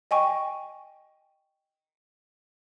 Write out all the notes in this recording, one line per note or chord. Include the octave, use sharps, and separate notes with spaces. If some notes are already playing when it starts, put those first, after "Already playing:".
D#5 G5 G#5 C#6